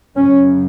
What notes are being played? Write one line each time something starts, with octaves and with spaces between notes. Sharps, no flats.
F#2 C#3 C#4